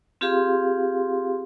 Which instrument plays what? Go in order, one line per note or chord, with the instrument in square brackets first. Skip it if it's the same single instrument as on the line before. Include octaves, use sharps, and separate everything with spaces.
[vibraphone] C4 F4 G4 G#4 F5 C6